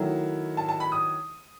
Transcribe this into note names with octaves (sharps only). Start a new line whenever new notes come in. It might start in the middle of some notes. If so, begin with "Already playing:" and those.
Already playing: D#3 F#3 A3 E4
A5
A5
B5
D#6